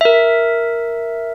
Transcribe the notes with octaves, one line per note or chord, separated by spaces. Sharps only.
A#4 E5